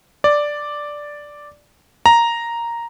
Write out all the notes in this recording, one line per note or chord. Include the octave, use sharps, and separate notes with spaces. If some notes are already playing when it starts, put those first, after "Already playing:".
D5
A#5